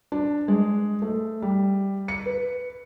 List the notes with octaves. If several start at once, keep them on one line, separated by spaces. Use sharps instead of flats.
D4
G#3
A3
G3
C#7
B4